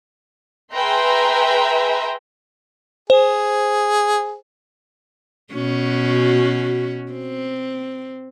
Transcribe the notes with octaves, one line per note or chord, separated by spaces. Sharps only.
G#4 B4 E5 G5 A#5 C6
G#4 C5
B2 C#4 F#4
C4